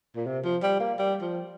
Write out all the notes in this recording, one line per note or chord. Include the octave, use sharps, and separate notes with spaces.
A#2
C3
F3
G3
A#3
G3
F3